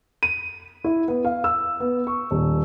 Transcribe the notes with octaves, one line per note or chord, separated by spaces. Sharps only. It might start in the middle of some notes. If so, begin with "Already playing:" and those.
D#7
E4
B3
F5
E6
B3
C#6
D#1